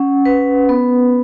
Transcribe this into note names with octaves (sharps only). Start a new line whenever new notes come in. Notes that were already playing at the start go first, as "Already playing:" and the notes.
Already playing: C#4 F#5
B4
B3